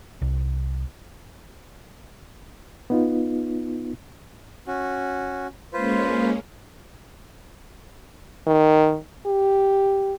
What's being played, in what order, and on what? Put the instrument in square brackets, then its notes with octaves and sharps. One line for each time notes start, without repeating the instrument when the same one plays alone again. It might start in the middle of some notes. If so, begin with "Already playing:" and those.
[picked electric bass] C2
[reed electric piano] B3 D#4 F4
[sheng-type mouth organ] C#4 F#4
[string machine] G#3 A#3 C#4 [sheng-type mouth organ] F4 B4 C5
[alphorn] D#3
G4